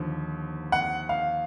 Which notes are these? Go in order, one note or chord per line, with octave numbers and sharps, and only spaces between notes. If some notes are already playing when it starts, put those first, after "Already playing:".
Already playing: D#2 D3 F3
F#5
F5